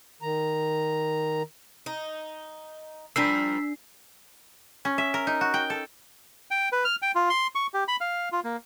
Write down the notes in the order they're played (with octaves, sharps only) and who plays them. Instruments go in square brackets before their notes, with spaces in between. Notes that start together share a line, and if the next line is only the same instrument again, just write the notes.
[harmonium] D#3 A#5
[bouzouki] D#4
[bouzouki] F3 G3 A#4 [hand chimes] D4 C7 [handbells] E6 B6
[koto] C#4
E5
A#4
D#4
F#4
G5
A4
[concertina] G5
B4
F6
G5
F4
C6
C#6
G4
B5
F5
F4
A#3